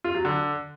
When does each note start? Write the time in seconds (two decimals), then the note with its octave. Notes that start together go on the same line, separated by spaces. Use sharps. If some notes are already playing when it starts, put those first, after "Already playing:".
0.04 F4
0.15 F#3
0.25 D3